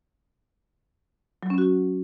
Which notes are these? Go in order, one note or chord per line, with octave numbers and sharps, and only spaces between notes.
F#3
C#4
F#4